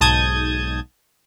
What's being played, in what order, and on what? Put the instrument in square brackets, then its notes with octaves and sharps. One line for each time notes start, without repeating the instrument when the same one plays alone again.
[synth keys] B1 G#2 A5 D#6 G6 G#6